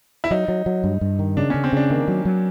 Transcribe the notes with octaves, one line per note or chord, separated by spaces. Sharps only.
E4
F#3 D#4
F#3
F#3
G2
G2
D#3
C#3 D4
C#3 C#4
C4
C#3 D4
D#3 A#3
F#3
F#3